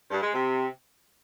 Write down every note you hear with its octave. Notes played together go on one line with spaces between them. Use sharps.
G2
G#3
C3